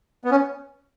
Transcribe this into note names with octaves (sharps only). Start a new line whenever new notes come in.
B3
C#4